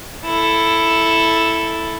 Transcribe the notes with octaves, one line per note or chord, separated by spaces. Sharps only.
E4 A4